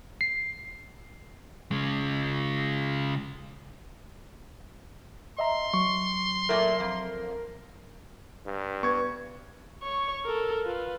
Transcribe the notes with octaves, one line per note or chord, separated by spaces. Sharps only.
C7
C#3 G#3
D#5 E5 A#5 C6
F#3 C#6
A#2 A3 A#4
F2
G2
B3 B4 C#6 G#6
C#5 C#6
A4 A#4
F4 B4